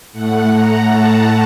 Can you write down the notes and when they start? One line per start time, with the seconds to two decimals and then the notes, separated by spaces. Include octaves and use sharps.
0.13 A2 A3 F#5
0.51 A#5
0.90 A5